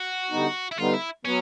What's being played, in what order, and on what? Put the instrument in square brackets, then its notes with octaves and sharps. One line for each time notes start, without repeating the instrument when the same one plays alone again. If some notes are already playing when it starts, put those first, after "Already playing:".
Already playing: [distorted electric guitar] F#4
[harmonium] D3 G3 B3 D#4
[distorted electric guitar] E4
[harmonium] D3 G3 B3 D#4 [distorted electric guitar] F4
[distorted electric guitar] E4
[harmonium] F#3 B3 [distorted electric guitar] C#4